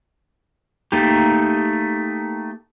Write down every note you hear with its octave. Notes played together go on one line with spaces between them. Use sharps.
A3 A#3 D#4 G4